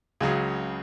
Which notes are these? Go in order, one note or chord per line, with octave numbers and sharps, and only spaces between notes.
C#2 C#3 F#3 G#4